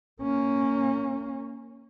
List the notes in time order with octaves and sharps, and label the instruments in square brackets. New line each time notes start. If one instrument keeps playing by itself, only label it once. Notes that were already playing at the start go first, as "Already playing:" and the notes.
[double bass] A#3 C#4